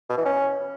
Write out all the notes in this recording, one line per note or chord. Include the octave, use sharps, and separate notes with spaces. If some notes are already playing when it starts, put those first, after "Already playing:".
B2
E3
C#4